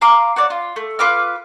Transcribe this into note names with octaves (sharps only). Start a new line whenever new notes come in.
F5 A#5 C6 D6
F#4 C#5 D5
F4
A3
F4 B4 D6 F6